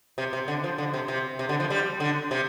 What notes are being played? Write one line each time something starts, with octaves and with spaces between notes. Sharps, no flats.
C3
C3
D3
F3
D3
C3
C3
C3
D3
F3
G3
D3
C3